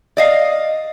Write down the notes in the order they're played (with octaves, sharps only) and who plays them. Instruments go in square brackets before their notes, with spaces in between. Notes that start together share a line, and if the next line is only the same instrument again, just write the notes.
[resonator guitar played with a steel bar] D5 D#5 F5